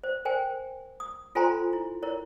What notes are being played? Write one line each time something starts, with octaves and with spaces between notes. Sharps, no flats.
C5
A#4 C5 G5 G#5
D#6
F4 A4 C5 G#5 A#5 C6
E4
E4 A#4 C#5